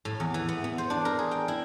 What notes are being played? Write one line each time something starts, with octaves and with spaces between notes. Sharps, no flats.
A2
E2
E3
B3
B3
C5
D4
A#4
G#4
G5
E4